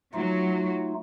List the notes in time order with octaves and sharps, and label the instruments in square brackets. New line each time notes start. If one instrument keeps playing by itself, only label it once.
[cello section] F#3 [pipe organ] A3 D#4 F4